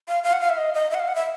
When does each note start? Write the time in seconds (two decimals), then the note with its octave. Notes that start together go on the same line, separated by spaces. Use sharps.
0.08 F5
0.24 F5
0.33 F#5
0.41 F5
0.49 E5
0.57 D#5
0.74 D#5
0.90 E5
0.94 F#5
0.99 F5
1.08 F#5
1.15 E5